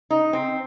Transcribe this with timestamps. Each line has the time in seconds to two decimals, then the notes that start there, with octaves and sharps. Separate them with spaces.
0.10 D#4
0.33 C4